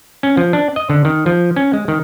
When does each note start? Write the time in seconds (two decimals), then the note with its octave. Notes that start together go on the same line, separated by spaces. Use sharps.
0.23 C#4
0.37 F3
0.53 D4
0.76 D#5
0.90 D3
1.05 D#3
1.26 F3
1.56 C#4
1.73 G#3
1.88 D#3